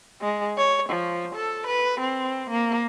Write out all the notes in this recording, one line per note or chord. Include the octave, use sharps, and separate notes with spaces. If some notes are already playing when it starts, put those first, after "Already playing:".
G#3
C#5
F3
A4
B4
C4
A#3